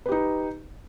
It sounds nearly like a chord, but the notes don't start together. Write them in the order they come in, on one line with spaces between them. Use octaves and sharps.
B4 G4 D#4